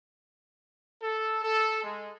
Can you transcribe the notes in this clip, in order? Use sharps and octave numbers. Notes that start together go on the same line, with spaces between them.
A4
A4
G#3